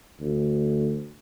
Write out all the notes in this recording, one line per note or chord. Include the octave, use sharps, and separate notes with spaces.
D2